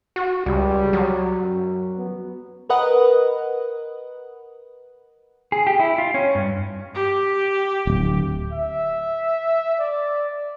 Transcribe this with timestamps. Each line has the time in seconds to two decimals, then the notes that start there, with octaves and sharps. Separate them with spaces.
0.16 F#4
0.46 C#2 G3
0.93 F#3
1.42 F#2
1.98 B3
2.69 A#4 B4 D#5 F#5
5.52 G#4
5.67 G4
5.80 E4
5.98 F4
6.14 C#4
6.35 G2
6.95 G4
7.87 D1
8.53 E5
9.80 D5